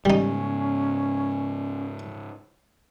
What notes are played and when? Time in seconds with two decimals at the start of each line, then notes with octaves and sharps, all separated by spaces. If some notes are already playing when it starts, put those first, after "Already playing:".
0.05 G#2 C#3 G3 C#4 D#4